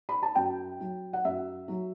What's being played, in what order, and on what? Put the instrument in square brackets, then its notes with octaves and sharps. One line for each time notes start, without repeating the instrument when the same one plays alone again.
[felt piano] B5
A5
F#2 G5
F#3
F#5
F#2 E5
F#3